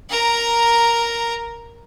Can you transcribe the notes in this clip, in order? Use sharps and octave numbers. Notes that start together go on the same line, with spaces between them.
A#4 A#5